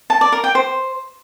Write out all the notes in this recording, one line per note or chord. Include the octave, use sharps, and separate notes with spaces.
A5
D5
A#4
G5
C5